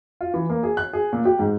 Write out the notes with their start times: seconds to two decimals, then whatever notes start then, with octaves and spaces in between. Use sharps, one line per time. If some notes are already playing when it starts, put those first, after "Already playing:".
0.21 F4
0.34 E3
0.50 A#3
0.63 G#4
0.77 F#6
0.93 G#4
1.13 A#2
1.25 G4
1.39 G#2